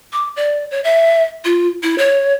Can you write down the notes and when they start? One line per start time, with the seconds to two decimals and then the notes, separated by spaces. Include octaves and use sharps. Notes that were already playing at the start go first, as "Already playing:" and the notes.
0.13 D6
0.36 D5
0.71 C#5
0.84 E5
1.45 F4
1.83 E4
1.98 C#5